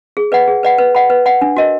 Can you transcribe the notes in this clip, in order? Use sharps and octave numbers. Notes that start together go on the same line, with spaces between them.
G#4
B4 D5 F#5
G#4
B4 D5 F#5
B4
D5 F#5 B5
B4
D5 F#5 B5
D4
F#4 A#4 D#5